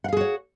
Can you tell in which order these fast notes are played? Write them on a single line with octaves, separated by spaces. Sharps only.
F#5 F5 G#4 F#4 C#5